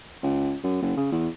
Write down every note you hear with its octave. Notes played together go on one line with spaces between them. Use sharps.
C#2
F#2
F#1
C#3
E2